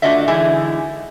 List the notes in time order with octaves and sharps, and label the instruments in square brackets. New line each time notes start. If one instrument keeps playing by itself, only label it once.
[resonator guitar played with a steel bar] A3 D4 F4 F#4 D#5 E5
D3 E3 G#3 D#4 E4 G#4